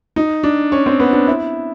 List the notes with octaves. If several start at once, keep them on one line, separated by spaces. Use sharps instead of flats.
D#4
D4
C#4
C4
B3
D4
E4